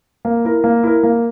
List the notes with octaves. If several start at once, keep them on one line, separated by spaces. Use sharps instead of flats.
A#3
E4 A#4
A#3
E4 A#4
A#3